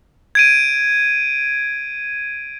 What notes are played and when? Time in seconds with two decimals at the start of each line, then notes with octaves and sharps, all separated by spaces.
0.35 G#6 D7 D#7